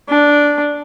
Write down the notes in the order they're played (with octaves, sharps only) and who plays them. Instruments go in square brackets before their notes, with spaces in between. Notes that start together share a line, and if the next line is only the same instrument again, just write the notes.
[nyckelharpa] D4